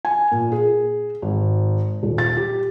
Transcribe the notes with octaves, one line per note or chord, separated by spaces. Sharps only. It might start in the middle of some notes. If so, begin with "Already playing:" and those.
G#5
A#2
G#4
G#1
D#1
A6
G4